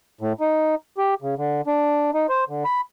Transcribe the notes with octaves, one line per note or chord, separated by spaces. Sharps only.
A2
D#4
G4
C#3
D3
D4
D#4
C5
D3
B5